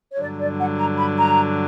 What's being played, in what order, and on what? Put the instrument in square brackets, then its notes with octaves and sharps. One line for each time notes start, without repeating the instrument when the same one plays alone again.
[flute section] C#5
[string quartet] G2 D3 F#3 [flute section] D5
[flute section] D5
F#5
A#5
B5
A#5